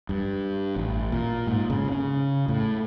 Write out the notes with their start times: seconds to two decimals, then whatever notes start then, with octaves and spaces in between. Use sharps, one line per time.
0.09 G2
0.76 A1
1.12 A#2
1.47 G#2
1.70 C#3
1.92 C#3
2.48 A2